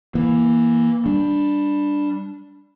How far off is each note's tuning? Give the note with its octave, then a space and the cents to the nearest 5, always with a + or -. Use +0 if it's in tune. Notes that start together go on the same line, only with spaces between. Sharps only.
E3 +0 A#3 +15
G3 +10 D4 +0